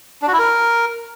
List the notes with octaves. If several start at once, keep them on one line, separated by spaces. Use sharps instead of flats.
D4
F#4
E4
A#4